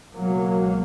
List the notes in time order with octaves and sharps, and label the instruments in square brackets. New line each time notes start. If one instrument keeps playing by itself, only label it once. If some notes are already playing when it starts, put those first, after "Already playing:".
[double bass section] C#2 B2 F#3 A#3